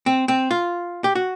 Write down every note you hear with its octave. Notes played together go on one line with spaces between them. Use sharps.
C4
C4
F4
G4
F#4